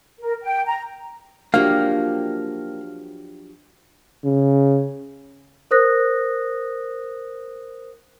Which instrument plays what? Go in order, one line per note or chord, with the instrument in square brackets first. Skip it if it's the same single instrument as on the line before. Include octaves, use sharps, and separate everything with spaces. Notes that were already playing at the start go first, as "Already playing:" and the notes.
[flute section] A#4
G5
A#5
[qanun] F3 F#3 C#5 [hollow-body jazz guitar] A#3 [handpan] D4 G4 [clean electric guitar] F5
[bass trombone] C#3
[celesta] A#4 C5 D#6 F#6 A#6